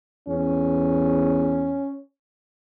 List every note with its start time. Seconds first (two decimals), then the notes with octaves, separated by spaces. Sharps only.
0.28 E2 C#4